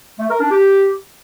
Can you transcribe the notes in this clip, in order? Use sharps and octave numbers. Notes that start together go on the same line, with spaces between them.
A3
A#4
D4
G4